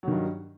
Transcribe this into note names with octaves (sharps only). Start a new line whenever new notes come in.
G2 D#3 F#3